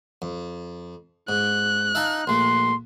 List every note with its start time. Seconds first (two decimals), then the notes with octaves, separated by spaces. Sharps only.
0.22 F2
1.29 G#2 F#6
1.95 D#4 E5 F5 A5
2.27 A#1 A3 C6